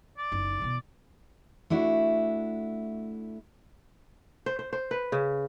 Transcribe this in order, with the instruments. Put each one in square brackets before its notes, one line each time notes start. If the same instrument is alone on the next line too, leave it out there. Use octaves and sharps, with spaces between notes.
[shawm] D5
[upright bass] F#1 D#4
B2 E3
[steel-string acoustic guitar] A3 D4 E4 F#4
[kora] C5
C5
C5
B4
C#3